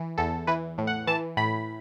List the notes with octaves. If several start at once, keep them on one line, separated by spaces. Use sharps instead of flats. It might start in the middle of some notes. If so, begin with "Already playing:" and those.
Already playing: E3
E2 A4
E3 B4
A2
F#5
E3 A5
A2 B5